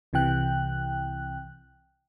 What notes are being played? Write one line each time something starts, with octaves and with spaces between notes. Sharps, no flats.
C2 C3 E3 G5 F#6